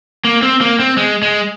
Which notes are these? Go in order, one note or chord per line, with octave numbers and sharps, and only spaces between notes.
A#3
C4
A#3
C4
G#3
G#3